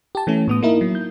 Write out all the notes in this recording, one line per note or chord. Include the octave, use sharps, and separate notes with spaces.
G4 A5
E3 A3 C#4
A2 B3 D#6
A#3 D#4 E4 A#4
F#3
G6